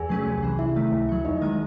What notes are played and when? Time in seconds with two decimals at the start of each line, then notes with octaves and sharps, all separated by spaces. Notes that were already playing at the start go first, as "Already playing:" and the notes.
Already playing: E2 G#4 G#5
0.09 C3 F#3 A3 C#4
0.26 C2
0.42 C3 E3
0.59 C3 E4 E5
0.76 D#3 A3
0.92 C#2
1.09 C#3 F#3
1.25 E2 D#4 D#5
1.41 D#3 G#3